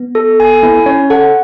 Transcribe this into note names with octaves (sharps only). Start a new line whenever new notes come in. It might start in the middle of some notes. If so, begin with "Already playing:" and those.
Already playing: B3
A4
G#5
B3 E4
C#4 C#5
A4 F#5